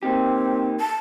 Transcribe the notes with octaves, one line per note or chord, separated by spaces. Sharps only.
A#3 C4 D#4 G4
A5